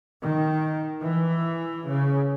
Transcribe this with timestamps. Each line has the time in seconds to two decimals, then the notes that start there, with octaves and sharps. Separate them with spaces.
0.21 D#3
1.01 E3
1.87 C#3